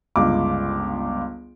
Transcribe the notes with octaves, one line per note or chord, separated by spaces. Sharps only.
G1 C#2 D6